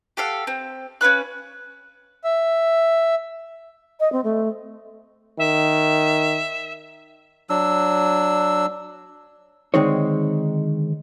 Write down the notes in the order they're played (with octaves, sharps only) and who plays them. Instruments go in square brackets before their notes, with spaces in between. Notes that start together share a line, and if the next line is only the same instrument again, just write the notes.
[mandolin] G4 A4 F5 F#5
C4
C#4 F4 B4 F#6
[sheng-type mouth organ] E5
[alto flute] D#5
C4
A3
[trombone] D#3 [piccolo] E5
[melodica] F#3 D4 E6
[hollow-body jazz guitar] D3 D#3 G#3 C4 D#4 C#5